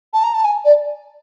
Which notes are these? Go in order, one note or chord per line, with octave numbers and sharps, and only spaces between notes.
A5
A#5
A5
G#5
D5